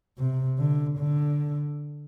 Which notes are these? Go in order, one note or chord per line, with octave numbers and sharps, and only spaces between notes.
C3
D3
D3